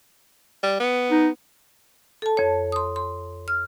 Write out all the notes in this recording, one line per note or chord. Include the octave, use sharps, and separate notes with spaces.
G3
B3
D#4
A4 A5
F2 C#5
C6 D#6
C6
F6